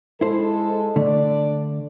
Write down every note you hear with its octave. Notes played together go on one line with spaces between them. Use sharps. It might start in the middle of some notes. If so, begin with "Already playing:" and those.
G#3 E4 A4 C5
D3 A3 D4 D5